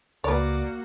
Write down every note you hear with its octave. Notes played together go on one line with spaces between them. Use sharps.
C#2 A#3 F#4 B4 C#5 D5